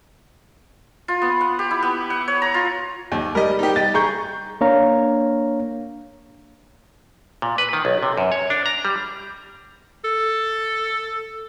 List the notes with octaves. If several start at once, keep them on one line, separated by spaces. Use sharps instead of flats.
F4
B3
F#5
G4
E4
B3
F#5
C#5
A#5
F4
D#2
G3 A#4 D#5
D#4 G4
D#5 G5 A6
G#4 A#5 C#6 G6
A#3 D4 C#5 F5 A#5
A#2
B4
D#3
B1
C3
F#2
C#5
D4
A#5
G3
A4